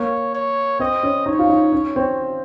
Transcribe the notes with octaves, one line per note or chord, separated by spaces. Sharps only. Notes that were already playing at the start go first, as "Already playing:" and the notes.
Already playing: A#3 C#5
C#5
C4 D#5
C#4
D#4 C#5
F4
D#4
C#4
C4